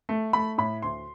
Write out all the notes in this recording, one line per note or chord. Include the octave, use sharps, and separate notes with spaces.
A3
A3 B5
A2 B5
D2 C6